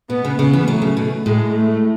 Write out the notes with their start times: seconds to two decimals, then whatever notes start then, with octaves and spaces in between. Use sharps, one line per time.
0.10 B2 B3
0.25 C#3
0.39 C#3 B3
0.53 E3
0.67 F#3 A3
0.82 C#3
0.97 B2
1.26 A2 G#3
1.54 A3